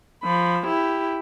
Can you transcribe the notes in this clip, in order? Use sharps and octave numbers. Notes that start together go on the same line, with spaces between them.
F3 B5
E4 G4